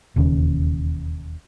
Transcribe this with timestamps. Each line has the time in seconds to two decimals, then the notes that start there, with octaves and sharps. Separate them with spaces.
0.16 E1 D#2 C#3